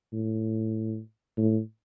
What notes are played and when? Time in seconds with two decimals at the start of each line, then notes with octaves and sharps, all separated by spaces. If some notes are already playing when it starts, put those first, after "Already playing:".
0.13 A2
1.37 A2